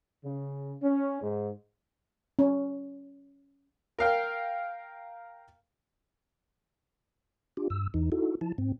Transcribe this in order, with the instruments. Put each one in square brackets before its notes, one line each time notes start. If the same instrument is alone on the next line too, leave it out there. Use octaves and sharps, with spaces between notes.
[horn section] C#3
C#4
G#2
[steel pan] C#4
[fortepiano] A#4 F5 G5
[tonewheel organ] D4 F4 G4
G2 E6
E2 E3 D#4
D#4 E4 F#4 A4
F3 E4 A5
G#2 C4